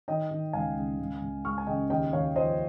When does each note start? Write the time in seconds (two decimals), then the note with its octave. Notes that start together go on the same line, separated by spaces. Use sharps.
0.08 D#3 D#5 G5
0.31 D#3
0.53 C#2 F5 G#5
0.77 C#2
0.99 C#2
1.22 C#2
1.45 G#3 C#6 F6
1.58 G#5
1.67 C#3 D#5 G5
1.90 D#2 D#5 G5
2.13 D#2 C#5 F5
2.36 F3 C5 D#5